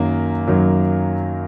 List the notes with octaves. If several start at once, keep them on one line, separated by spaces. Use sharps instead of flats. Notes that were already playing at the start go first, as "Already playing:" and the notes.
Already playing: F#2 D#3 F#3 A#3
F#2 D#3 F#3